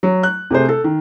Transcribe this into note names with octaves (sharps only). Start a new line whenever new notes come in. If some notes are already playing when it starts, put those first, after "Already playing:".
F#3
F#6
C3 A3 G#4 C5
A4
D#3